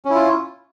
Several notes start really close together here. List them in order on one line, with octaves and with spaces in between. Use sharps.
C#4 E4 F4